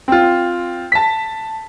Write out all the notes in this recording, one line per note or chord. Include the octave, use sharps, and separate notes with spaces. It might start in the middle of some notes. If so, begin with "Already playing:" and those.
C4 F4
A5 B6